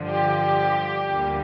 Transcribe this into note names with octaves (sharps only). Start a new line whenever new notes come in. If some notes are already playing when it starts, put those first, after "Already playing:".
Already playing: G2 D3 F3
G4
D2 D3 G3 A#3